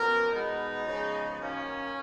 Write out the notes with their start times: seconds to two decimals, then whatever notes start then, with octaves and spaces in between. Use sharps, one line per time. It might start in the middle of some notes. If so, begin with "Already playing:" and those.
Already playing: F#2 F3 B3 A#4
0.31 B2 G#3 B3 D#4
0.85 C#3 F3 G#3 B3
1.39 F#2 D#3 A#3 C#4